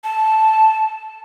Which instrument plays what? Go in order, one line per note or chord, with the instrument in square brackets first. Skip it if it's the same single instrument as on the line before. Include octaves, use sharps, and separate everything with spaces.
[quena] A5